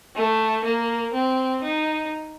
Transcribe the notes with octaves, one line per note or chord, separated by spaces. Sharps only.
A3
A#3
C4
D#4